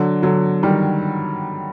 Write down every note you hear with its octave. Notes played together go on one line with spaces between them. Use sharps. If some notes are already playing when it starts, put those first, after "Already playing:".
Already playing: D3 F#3
D3 F#3
D#3 G3